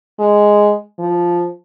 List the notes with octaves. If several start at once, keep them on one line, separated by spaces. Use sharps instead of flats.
G#3
F3